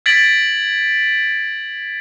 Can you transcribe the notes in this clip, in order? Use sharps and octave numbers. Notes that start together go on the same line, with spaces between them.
G#6 A6 B6 D7 F#7